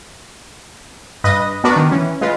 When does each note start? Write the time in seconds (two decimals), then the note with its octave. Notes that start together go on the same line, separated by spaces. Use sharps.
1.24 G2 B4 D#5 A#6
1.64 B3 D4 F#4 A#4 B4 D5
1.76 D#3
1.91 E3 C#4
2.21 G#3 F4 B4